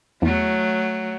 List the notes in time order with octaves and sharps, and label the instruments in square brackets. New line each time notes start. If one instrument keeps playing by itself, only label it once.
[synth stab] E2 [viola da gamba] F#3 A3